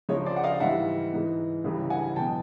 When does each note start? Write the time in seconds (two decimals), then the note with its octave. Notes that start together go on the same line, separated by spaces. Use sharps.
0.09 C#2 C#3 F3 G#3 C#5 D#5
0.26 C5 D5
0.36 F#5
0.43 D#5 F5
0.60 G#2 E3 G3 E5 F#5
1.13 G#2 E3 G#3
1.64 C#2 C#3 E3 G3
1.90 F#5 G#5
2.16 E2 B2 F#3 G5 A5